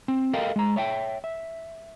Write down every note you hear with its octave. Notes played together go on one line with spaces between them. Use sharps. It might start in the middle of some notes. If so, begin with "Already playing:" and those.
C4
A4 A#4 D#5 F5 G5
G#3 A#5
C#5 E5 F#5 G5
E5